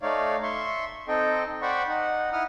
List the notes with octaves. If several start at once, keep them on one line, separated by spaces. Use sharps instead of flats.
A3 D#4 C#5 D5 F5
E5 C6 C#6
C4 D#4 A4 D#5 G5
C5 D5 F#5 G5 B5 C#6
D#4 F#5
E4 F#5 D#6 F6